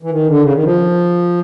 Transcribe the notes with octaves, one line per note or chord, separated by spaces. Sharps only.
E3
D#3
D3
C#3
D#3
F3